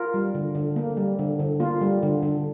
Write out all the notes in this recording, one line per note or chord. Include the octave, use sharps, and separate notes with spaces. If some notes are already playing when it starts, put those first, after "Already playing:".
Already playing: F4 A#4
G3
D3
D3
A#3
G3
D3
D3
A#3 F4
G3
D3
D3